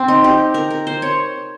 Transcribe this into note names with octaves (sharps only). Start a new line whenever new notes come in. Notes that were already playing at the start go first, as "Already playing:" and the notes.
Already playing: C4
D#4
G4
A#4
A#4
C5
C#5